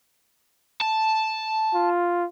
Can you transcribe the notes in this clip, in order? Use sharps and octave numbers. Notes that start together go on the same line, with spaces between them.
A5
F4